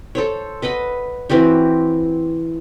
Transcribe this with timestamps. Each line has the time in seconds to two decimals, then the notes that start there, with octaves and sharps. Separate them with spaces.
0.15 A4 C5 C#5
0.62 B4 D#5 F#5 B5
1.30 E3 C4 F#4 G4